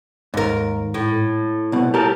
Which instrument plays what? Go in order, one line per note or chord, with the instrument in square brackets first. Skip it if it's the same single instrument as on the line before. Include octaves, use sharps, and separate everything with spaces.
[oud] D#2 A#4 [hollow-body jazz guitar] G#2
[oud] A2
[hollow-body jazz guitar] C2 B2
G4 A4 A#4